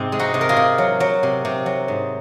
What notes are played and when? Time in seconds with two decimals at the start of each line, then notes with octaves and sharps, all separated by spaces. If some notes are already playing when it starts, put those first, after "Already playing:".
Already playing: G#2 C3 C4
0.12 G#3
0.19 D#4 F#4
0.34 C3
0.41 A#4
0.49 F4 G#4
0.57 C3
0.78 F#3
1.00 F#3
1.23 C3
1.45 C3
1.66 F#3
1.88 G#2